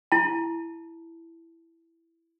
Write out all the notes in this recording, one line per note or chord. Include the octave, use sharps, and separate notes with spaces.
E4 A5